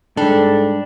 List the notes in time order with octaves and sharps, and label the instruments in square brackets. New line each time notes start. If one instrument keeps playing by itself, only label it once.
[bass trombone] G#2 [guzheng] G3 [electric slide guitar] D4 [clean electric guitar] A4